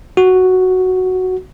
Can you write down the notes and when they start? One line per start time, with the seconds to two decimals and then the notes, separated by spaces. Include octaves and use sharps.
0.17 F#4